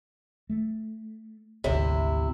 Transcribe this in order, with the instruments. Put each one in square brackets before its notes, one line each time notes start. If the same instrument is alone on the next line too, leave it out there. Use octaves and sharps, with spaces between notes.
[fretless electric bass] A3
[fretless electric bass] G#1 D2 [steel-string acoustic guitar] C3 E4